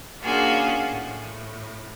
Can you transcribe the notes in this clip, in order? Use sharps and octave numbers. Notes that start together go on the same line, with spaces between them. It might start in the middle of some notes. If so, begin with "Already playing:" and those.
A#3 C#4 D4 F4 F#4 G#4
A2